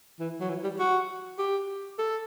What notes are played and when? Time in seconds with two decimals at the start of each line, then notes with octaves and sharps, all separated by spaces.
0.19 E3
0.40 F#3
0.49 E3
0.63 G3
0.79 F#4
1.38 G4
1.98 A4